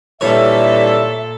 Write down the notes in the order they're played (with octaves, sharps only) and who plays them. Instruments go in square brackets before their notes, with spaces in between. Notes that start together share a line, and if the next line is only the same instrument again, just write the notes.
[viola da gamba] A#2 A4 [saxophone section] D3 E3 G3 [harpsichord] C#5 [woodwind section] E5